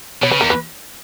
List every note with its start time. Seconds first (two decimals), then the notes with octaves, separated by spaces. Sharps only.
0.23 B2 C#5
0.31 C#3 B4
0.40 E2 A#4
0.50 B4